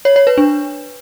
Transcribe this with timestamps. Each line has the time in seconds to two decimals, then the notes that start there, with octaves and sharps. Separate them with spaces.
0.05 C#5
0.16 C#5
0.27 B4
0.38 D4